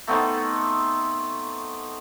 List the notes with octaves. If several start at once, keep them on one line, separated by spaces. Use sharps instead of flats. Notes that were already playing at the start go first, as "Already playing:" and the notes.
A3 B3 C4 D#4